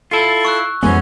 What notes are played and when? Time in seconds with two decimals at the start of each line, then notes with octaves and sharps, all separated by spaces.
0.11 E4 F4 A4
0.45 C#6 E6 F#6
0.83 F2 E3 G#3 B3 C#4 F#4 G#5